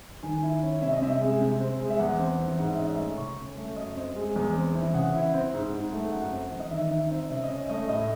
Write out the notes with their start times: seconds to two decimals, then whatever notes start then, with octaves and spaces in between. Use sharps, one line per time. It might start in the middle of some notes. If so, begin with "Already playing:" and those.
0.23 D#3 G#5
0.43 E4
0.62 C#4
0.82 C3 E5
0.92 D#5
1.01 C3 E5
1.21 G#3
1.41 C3
1.60 C4
1.80 G#3
1.90 E5
1.99 E2 F#5
2.19 C4
2.39 E3
2.59 G#2 F#5
2.69 E5
2.78 C#4 D#5
2.89 E5
2.98 A3
3.17 C#3 C#6
3.37 C#4
3.57 A3
3.76 F#2 D#5
3.96 C4
4.16 G#3
4.36 E2
4.56 C4
4.74 E3
4.94 C#3 F#5
5.14 E4
5.34 C4
5.53 G#2
5.73 G#2
5.93 A3
6.12 F#2 F#5
6.32 C4
6.52 E3
6.60 D#5
6.71 D#3 E5
6.91 D#4 E5
7.10 C4 E5
7.30 C#3 E5
7.44 D#5
7.50 C#4
7.70 A3 D#5
7.89 A2 D#5